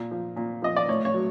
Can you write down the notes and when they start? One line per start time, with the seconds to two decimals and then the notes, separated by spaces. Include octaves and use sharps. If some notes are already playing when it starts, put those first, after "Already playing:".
Already playing: A#2
0.11 F3
0.36 A#2
0.62 F3 D#5
0.76 D5
0.88 A2 C#5
1.05 C#5
1.14 F#3